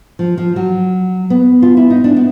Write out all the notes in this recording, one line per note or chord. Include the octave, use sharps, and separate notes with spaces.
F3
F3
F#3
B3
F4
E4
D#4
D4
B3